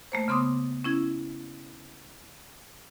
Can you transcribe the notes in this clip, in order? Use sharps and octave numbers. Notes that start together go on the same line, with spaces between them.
A3 A#3 C5
C#3 B3 C6 D6 D#6
C#4 E4 G#6